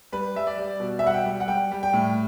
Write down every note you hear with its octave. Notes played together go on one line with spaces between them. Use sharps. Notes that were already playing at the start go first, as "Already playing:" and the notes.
G3 B4
G3 E5
D5
G3
B2
E5
G3 F#5
G5
G3
F#5
G3 G5
G3
G5
A2